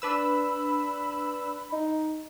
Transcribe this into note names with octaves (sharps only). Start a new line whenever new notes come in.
D4 B4 B5 E6
D#4